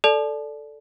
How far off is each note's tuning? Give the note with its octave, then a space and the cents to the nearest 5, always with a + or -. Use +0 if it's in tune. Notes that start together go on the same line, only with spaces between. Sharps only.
A4 +0 D5 +0 A5 -30